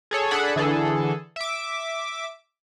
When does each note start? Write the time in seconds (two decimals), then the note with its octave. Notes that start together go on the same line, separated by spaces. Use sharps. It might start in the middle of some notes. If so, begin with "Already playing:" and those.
0.11 G#4 A4 C#5
0.31 D4 G#4 A4 F#5 B5
0.56 D3 E3 G#4 A4
1.36 E5 D6